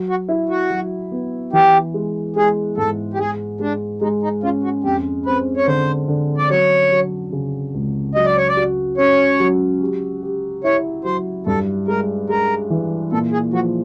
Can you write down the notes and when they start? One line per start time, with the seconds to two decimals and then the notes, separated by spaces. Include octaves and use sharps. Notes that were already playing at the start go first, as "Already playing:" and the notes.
Already playing: F#3
0.09 F#4
0.29 E4
0.49 F#4
0.70 F#3
1.12 B3
1.53 E3 G4
1.94 G#3
2.36 G#3 G#4
2.77 G#2 A4
3.14 G4
3.18 G#3 G#4
3.60 G#3 D4
4.01 G#3 D#4
4.23 D#4
4.43 C#4 F4
4.63 F#4
4.84 F2 G4
5.26 C4 B4
5.57 C#5
5.67 D3 C5
6.08 D3
6.38 D5
6.50 F#3 C#5
6.92 F#3
7.32 C#3
7.74 C#2
8.15 F#3 D#5
8.26 D5
8.37 C#5
8.48 D5
8.57 F#4
8.98 C#4 C#5
9.40 F#3
9.80 G4
10.23 G4
10.64 E4 C#5
11.04 F#3 C5
11.47 G2 A4
11.88 G#3 A#4
12.29 G#3 A#4
12.70 E3
13.12 A#2 A4
13.32 G#4
13.53 F3 F#4